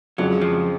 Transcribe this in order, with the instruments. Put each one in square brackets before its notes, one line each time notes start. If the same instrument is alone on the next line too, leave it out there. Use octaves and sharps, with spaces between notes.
[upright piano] F2 C#3 G#3 [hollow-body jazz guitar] F#3
[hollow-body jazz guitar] F3